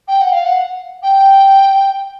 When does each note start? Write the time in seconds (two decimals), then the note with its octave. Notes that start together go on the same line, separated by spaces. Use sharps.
0.08 G5
0.21 F#5
0.32 F5
0.45 F#5
1.03 G5